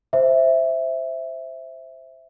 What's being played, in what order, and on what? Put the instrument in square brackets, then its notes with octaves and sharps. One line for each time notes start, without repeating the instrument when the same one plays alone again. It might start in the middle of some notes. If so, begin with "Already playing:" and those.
[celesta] C5 E5